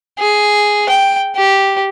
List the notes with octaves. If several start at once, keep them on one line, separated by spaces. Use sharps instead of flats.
G#4
G5
G4